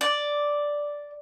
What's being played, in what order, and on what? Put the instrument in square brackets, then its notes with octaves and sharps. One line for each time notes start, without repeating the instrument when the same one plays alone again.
[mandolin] D5